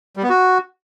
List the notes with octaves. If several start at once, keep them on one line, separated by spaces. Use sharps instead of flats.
G3
B3
F#4